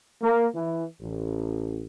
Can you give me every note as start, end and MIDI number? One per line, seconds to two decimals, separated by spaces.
0.22 0.46 58
0.55 0.85 52
1.02 1.87 33